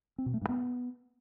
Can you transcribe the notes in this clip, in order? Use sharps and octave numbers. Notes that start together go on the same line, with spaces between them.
C4
B2
A3
G2
B3